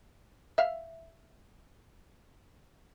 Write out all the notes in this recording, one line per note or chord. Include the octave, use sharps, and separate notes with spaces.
E5 F5